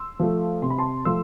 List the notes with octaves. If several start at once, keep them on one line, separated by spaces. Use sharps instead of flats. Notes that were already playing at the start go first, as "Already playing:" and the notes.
Already playing: C6 E6
F3 A3
C3 C6
B5
A5 C6
F3 A3 C6 E6